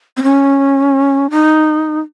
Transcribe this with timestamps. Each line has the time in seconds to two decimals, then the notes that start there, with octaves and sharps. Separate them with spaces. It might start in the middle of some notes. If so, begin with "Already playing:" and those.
0.17 C4
0.23 C#4
1.30 D#4